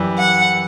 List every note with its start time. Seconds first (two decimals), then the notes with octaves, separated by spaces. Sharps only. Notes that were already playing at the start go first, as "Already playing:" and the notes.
Already playing: F#2 E3 G3
0.18 F#5